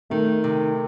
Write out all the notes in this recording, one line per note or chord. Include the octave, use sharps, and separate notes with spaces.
D#3 A3
C3